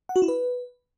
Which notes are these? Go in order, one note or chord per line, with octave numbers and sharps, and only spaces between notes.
F#5
F#4
E4
B4